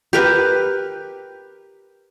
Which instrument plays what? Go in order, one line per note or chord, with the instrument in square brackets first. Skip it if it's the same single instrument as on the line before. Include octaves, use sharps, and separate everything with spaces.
[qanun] G4 A#4 B4